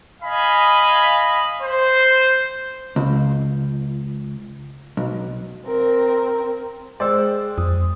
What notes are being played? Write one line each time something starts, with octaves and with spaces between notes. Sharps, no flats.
D#5 F5 G#5 B5
C5
C#2
B1
C4 A#4
G#3 G#4 C5 D5 G5 E6
F2 D#6